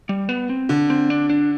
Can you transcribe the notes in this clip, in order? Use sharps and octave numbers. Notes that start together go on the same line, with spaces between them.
G3
B3
C4
D3
C4
D4
D4